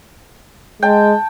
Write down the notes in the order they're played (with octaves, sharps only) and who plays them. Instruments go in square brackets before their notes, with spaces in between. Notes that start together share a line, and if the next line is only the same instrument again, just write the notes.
[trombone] G#3 [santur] G5 A5